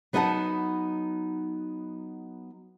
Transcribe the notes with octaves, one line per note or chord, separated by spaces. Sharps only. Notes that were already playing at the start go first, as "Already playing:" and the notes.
F#3 B3 D#4 F#5 G#5 A5